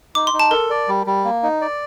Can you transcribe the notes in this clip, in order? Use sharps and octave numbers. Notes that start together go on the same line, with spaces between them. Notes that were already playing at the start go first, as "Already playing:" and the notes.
D#4 D6
C6
D#4
A5
A4 A#4
D5
G3
G3
A#3
D#4
D5